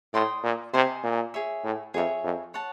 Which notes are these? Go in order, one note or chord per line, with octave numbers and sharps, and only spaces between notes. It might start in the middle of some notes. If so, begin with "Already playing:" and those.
A2 D5 G5 C6 D#6
A#2
C3 C5 D#5 G#5
A#2
G#4 C#5 E5
A2
F2 G#4 C#5 E5
F2
C#5 F#5 A5